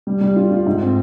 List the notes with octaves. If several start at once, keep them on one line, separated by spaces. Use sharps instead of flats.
G3
G3
F4
F4
G#2
C4